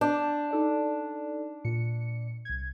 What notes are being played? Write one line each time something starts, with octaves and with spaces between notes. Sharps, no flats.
D4 G6
D#4 A4 D5
A#2 C#7
C2 G#6